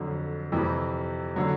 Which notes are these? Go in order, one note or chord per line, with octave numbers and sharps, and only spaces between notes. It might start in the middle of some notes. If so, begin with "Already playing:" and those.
Already playing: F2 D3 F#3
F2 C3 E3 G3
D3 F#3